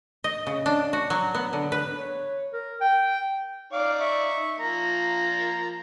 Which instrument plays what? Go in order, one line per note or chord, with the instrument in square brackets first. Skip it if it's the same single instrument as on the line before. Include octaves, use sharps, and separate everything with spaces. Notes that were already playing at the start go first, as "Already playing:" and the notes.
[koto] D#5
C#3
D4
F#4
F#3
B3
D3
B4
[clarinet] C#5
A#4
G5
[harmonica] D#4 D5 [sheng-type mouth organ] F5 D6
[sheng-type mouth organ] E5 C#6
[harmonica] F3 A#3 [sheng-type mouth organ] A#5